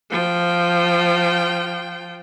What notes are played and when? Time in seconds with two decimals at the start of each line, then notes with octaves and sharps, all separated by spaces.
0.11 F3 G5